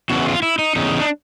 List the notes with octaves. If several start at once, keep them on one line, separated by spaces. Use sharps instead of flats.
E2 C#3 E3 F#4
F4
E4
D#4
E2 C#3 D#4
D4